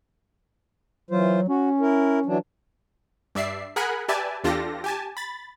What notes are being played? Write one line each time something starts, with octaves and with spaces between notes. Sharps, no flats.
E3 F#3 F4 C5
C#4 F#4
E4 A#4
E3 F#3 D4
G2 D5 E5 C7
G#4 A#4 F#5 G#5 B5 F#6
G4 B4 D5 E5 G#5 A5
E2 D4 F4 G4 A4 A#6
G4 G#5 A5
B5 A6